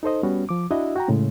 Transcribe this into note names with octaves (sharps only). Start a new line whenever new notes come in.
D#4 A4 C5 D#5
G3 B3 C#4 F#4
F3 D6
D4 E4 F#4 D#5 E5
F#4 G5 A#5
A2 C#3 G#3